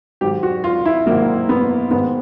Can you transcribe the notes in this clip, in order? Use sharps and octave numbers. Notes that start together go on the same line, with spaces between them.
G#2 D#3 F#3 G4
F#4
F4
E4
G#2 D#3 F#3 A#3
B3
G#2 D#3 G#3 B3